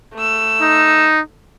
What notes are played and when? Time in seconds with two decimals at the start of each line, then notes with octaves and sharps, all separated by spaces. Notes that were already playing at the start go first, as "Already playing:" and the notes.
0.15 A3 E6
0.61 D#4